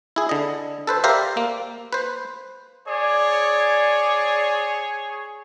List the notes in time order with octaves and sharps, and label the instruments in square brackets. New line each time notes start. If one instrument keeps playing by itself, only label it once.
[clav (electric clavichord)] E4 G#4
D3 D#5
A4 B4 C5
G4 A#4 C5 D5 E5 F5
A#3
B4 C5
[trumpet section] G#4 C#5 [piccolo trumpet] D5